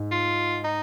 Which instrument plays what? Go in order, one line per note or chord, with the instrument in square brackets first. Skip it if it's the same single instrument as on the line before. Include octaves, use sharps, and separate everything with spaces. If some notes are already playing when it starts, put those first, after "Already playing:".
Already playing: [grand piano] G#2
[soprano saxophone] F4
D#4